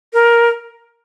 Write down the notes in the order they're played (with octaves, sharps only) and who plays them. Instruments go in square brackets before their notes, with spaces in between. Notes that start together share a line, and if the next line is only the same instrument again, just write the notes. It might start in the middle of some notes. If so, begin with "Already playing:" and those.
[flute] A#4